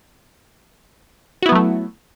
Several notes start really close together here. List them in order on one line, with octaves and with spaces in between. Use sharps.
F#4 E4 B3 F#3 A3